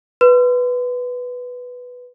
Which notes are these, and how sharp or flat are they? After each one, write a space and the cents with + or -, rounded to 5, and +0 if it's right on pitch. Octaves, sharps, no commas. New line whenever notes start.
B4 +0 C6 -35